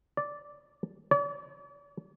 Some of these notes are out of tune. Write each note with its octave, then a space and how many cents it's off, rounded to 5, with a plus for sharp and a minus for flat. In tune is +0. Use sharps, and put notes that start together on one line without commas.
D5 -10
D5 -45